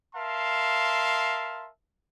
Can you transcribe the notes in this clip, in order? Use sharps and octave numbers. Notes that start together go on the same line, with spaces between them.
A#4 E5 F5 A5 C6